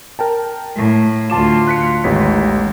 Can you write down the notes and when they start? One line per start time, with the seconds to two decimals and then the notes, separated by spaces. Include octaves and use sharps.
0.19 A#4 G5 A5
0.77 A2
1.30 D2 F4 A5 D6 E7
1.68 F#6 B6 C#7
2.04 A1 D#2 G#3 B6